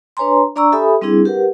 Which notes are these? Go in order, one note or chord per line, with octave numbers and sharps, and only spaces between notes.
D4 B4 C#5 G#5 A#5 C6
D4 D5 A#5 C#6 E6
G4 A4 E5 G#5 B5 D#6
G3 C4 D4 E4 G#4
G4 A#4 B4 F#5